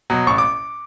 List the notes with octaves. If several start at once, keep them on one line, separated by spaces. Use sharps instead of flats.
B2 F#3
A1 C#6
D6